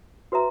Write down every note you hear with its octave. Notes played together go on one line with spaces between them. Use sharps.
F#4 B4 E5 A#5